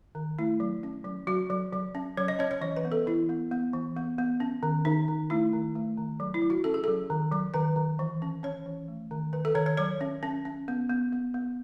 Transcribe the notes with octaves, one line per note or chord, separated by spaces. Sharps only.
D#3
A3 E4
F#3
C#4
F#3
F#3 F#4
F#3
F#3
C#4
F#3 C#5
D#5
C#4 C#5
C#5
E3 D#5
B4
B3
A4
E3 E4
B3
B3
E3
B3
B3
C#4
D#3
D#3 D#4
D#3
A3 E4
D#3
A3
D#3
F#3
E4
F#3
F#4
C#4 A4
G#4
F#3 A4
D#3
F#3
D#3 B4
D#3
E3
C#4
C#4 C#5
E3
A3
D#3
D#3 B4
A4
D#3 C#5
C#5
F#3 C#5
C#4
C#4
C#4
B3
B3
B3
B3